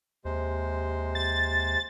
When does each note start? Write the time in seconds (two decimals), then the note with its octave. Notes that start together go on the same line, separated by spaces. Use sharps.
0.25 D#2 C3 G#3 C5
1.15 A6